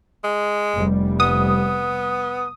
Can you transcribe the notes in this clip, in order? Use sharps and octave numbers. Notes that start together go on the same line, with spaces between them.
G#3
F1 G3
B3 D#6